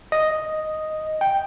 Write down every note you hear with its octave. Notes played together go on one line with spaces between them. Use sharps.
D#5
G5